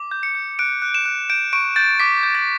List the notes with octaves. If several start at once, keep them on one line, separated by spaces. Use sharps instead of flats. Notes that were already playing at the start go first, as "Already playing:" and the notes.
Already playing: D6
G6
C#7
G6
F#6 D7
F#6
E7
F#6
G6 D7
C#6 D7
G6 A6
D6 B6
G6
A6